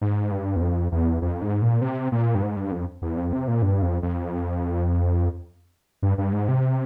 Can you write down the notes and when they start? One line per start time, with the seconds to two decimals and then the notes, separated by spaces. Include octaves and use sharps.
0.01 G#2
0.32 G2
0.56 E2
0.61 F2
0.92 E2
1.22 F2
1.42 G#2
1.62 A#2
1.81 C3
2.12 A#2
2.35 G2
2.43 G#2
2.56 G2
2.72 F2
3.02 E2
3.17 F2
3.33 C3
3.48 A#2
3.62 G2
3.82 F2
4.02 F2
6.02 G2
6.18 G2
6.33 G#2
6.48 C3